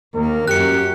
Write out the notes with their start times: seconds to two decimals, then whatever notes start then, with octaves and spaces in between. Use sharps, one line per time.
0.15 D#2 A#3 A#4
0.48 F#2 G4 F#6 C#7